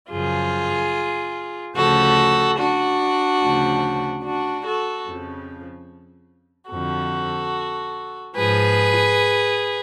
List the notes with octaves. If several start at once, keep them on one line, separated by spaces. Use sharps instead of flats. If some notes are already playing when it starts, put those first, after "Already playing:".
F#2 C#3 F3 F4 G#4
D2 C#3 F3 F#4 A4
D4 F#4
D2 C#3 F3
D4 F#4
F#4 A4
F2 C#3 F3
F2 D3 F3 F#4 A4
G#2 F3 G#4 B4